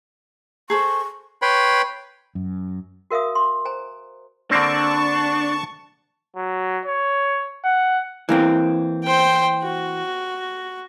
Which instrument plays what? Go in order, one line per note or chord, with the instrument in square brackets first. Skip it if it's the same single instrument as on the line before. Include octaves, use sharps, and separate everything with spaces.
[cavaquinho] G#4 A4 C5 [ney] C#6
[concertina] B4 C#5 G5 B5 C6
[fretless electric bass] F#2
[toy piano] F#4 A#4 E5 F5 D#6
C6
C5 G#5 A#5
[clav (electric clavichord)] D3 A#3 C4 [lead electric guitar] D4 [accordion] A5 C#6
[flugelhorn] F#3
C#5
F#5
[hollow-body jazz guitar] E3 A#3 C4
[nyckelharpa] C5 G5
F#4